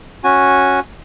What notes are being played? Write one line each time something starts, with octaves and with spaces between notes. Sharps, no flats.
C#4 F#4 G#5